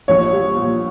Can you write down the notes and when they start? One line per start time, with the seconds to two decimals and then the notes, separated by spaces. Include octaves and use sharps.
0.08 A#1 C#5
0.32 G3
0.55 A#2